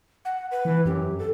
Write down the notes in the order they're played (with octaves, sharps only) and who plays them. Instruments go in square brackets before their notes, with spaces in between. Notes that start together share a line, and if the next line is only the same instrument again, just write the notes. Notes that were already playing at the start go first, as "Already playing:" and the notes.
[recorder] F#5
B4
[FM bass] E3
[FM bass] F#2 [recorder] G4
[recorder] A4